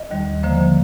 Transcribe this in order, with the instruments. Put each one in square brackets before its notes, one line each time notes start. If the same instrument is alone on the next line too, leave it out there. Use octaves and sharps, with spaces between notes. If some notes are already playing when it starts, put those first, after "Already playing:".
Already playing: [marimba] D#5
D#2 D#3 G3
D3 F3 A#3 C5